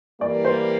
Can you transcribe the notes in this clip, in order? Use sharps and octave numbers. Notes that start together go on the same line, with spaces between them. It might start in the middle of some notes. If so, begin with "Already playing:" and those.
E3 G3 A#3 D5
C5